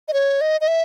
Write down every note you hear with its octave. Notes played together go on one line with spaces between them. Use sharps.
D#5
C#5
D#5
D#5
E5